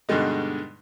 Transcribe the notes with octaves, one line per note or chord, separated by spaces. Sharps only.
G2 B2 D3 G3 G#3 D#4